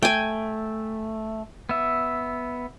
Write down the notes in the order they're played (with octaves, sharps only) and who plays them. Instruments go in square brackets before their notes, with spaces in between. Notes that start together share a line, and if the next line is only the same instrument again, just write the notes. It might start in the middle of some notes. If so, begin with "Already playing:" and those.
[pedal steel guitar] A3 [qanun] G5 G#5
[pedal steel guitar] B3 E5